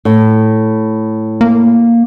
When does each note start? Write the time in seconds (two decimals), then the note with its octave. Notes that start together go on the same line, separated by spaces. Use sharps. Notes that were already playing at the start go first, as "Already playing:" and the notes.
0.05 A2
1.41 A#3